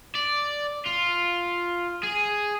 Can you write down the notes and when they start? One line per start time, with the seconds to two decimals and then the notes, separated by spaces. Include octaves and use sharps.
0.15 D5
0.86 F4
2.04 G#4